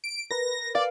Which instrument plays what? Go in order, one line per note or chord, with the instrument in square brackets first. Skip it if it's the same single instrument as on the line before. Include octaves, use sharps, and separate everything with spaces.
[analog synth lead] D7
[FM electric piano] A#4 B4 [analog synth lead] A#6
[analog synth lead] D5 [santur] F5